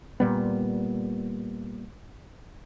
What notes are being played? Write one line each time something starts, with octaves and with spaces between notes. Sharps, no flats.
A#2 G3 B3